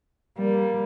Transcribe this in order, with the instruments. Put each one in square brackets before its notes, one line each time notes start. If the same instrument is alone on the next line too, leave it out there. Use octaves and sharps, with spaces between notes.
[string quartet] G3 A#3